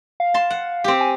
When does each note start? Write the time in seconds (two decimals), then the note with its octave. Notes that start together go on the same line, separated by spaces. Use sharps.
0.20 F5
0.34 A5 C6
0.50 F#5
0.84 C4 G4
1.01 G#5